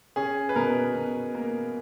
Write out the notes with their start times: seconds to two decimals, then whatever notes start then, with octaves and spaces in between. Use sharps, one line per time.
0.16 C#4 G#4
0.49 B4
0.56 B2 A#4
0.95 B2
1.35 A#3